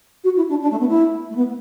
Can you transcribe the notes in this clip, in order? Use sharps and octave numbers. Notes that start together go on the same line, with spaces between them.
F#4
E4
D4
D4
A3
B3
E4
A3
B3